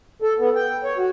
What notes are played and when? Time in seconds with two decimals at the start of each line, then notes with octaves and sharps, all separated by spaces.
0.22 A4
0.39 B3
0.56 G5
0.84 C#5
0.98 F#4